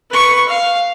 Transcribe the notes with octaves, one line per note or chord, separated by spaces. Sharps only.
B4 C#6
F5